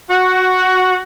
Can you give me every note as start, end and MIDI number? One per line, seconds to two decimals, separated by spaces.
0.09 0.98 66